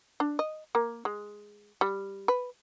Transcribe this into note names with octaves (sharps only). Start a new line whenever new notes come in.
D4
D#5
A#3
G#3
G3
B4